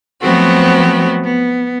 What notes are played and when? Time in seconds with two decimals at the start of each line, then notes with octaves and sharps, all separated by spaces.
0.22 F3 F#3 A3 B3 C4 F#4
1.24 B3